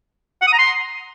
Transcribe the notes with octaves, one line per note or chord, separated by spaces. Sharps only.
F#5
D#6
A#5
C6